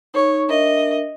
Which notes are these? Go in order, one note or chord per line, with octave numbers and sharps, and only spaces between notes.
D#4 C#5
D4 A#4 D#5 E5